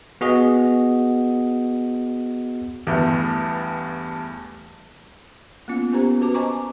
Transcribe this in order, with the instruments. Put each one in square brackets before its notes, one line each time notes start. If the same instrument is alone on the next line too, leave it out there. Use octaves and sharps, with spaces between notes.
[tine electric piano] B3 F#4 G#4 D#5
[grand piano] E2 G2 A3
[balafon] A#3 B3 C#4 F4
B3 C#4 G4 A#4 C5 A#5
F#4 B4 A5 D6
C5 D#5 G#5 A#5 C#6 D6